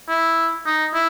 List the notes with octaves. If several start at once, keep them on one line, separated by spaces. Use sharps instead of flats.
E4
D#4
E4